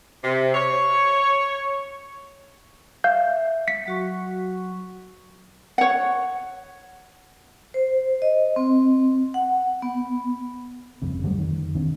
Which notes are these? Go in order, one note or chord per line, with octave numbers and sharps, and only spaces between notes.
C3
C#5
E5 F5 G6
B6 C#7
F#3 F#4 C#6
C#5 F#5
C5
D#5
C4
F#5
B3
G1 F2 C#3
D3 F#3 G3 A3
F2 D#3
E2 D#3 C4 D4